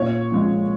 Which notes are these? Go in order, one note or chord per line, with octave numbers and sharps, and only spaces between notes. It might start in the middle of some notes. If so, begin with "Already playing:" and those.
Already playing: A#2 C#5
F3 G#3